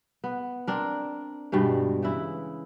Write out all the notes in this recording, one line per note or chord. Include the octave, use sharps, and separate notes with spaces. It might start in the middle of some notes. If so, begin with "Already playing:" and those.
B3
C4 D4 A#4
G2 B2 G3 G#3
C#3 E3 E4